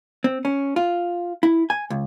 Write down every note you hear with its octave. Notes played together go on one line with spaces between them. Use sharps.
C4
C#4
F4
E4
G#5
C#2